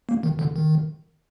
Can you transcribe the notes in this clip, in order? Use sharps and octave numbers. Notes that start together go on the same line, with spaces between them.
A#3
D#3
D3
D#3